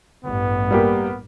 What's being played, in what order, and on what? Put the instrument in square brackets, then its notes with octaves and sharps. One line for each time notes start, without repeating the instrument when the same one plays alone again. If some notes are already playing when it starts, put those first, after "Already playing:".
[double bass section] A1 G2 [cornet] B3
[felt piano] G3 A#3 G4